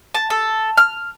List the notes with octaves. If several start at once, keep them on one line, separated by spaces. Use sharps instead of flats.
A5
A4
F6